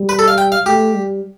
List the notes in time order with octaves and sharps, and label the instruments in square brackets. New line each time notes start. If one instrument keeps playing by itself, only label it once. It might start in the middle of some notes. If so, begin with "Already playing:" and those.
Already playing: [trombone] G3
[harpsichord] B4
A4
F5
G5
F5
[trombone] A3 [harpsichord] G4
[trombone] G3